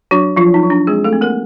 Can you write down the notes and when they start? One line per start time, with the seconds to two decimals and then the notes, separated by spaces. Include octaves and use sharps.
0.11 F#3 D4 F#4
0.36 F3 F#3 F4
0.54 D#4
0.63 F#3
0.70 D4
0.87 G#3 C4 G#4
1.04 A3 A4
1.13 C4
1.21 A#3 A#4